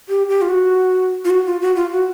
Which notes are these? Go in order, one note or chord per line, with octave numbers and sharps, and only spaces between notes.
G4
G4
F4
F#4
F4
F#4
F4
F#4
F4
F#4